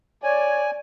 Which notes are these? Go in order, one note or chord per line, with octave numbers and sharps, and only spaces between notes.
C#5 D5 G#5